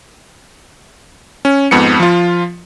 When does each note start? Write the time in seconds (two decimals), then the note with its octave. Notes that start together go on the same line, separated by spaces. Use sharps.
1.45 C#4
1.71 F2 G#2 B3 C#7
2.00 F3 F4